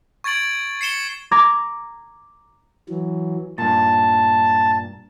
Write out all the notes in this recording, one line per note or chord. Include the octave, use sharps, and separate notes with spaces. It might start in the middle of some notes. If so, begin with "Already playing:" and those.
C#6 G#6 A6 D7 F#7
C7 C#7 E7 G7
A#5 D6 G#6 A#6
E3 F#3
G2 A#2 A5